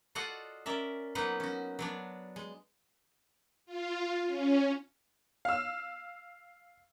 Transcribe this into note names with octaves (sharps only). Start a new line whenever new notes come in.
F4 F#4 A4 D5 D#5 F#5
C#4 A#4 D5 E5
F#3 A#3 B3 D#4 B4 F#5
C#4 F#4
F#3 B3 D4
G#3
F4
C#4
F5 E6